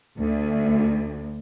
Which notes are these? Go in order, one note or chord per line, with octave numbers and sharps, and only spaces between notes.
D2